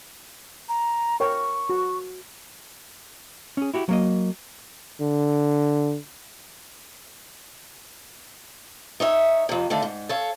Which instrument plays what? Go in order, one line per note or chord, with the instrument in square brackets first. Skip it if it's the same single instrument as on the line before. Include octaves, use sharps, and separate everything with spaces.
[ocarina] A#5
[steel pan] A#4 C#5 G5 [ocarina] C#6
[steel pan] F#4
[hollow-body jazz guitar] C#4 G#4
E4 F#4 G4
F#3 A#3 D#5
[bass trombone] D3
[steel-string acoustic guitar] D#4 C#5 E5
F2 C3
D3 D#3 A3 F5
G#2
A4 C#5 F5